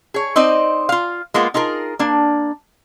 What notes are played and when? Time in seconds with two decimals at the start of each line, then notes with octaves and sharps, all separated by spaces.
0.14 G#4 C#5
0.36 C4 D#4 C5 D5 D#5
0.89 F4 F5
1.34 G#3 A#3 B3 F4
1.54 D#4 F4 G#4 A#4
1.99 A#3 D4